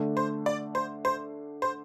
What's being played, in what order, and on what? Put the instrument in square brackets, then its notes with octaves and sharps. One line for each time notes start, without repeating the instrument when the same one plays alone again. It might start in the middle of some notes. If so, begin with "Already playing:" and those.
Already playing: [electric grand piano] D3 A3 D4
[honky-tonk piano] C5
D5
C5
C5
C5